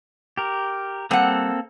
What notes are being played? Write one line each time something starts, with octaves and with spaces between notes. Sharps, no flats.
G4 A#4
G3 A#3 C4 A4 F#5